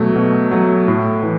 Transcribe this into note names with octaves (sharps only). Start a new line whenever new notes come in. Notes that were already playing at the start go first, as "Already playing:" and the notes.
Already playing: B2 F#3 A3
B2
F#3 A3
A2
E3